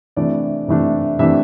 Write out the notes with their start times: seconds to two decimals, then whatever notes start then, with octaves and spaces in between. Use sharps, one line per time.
0.16 C3 E3 A3 D4 D5
0.68 C3 E3 A3 D4
1.19 C3 E3 A3 D4 E5